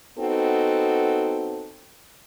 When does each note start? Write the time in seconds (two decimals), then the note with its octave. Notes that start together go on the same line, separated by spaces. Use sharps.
0.18 B3 C4 D#4 F#4 A4